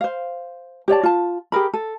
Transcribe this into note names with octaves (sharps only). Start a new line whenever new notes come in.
C5 F5
G4 C#5 D5 A5
F4 A5
G4 G#4 A#4 B5
A4